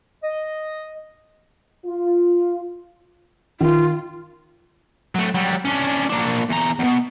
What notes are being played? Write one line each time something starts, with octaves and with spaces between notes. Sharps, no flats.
D#5
F4
D#3 F4
F#3 A3
F#3 G3
C#4 D4
A#3 D4
E2 A#5
E2 B2